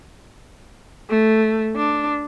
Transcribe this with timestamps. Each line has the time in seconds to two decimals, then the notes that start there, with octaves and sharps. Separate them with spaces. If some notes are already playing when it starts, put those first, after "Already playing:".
1.10 A3
1.76 D4